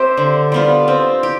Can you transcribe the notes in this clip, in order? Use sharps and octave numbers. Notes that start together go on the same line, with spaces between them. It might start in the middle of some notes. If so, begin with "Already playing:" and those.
Already playing: C4 G4 C5 E5
D3
G3 B3 F4
C4
G4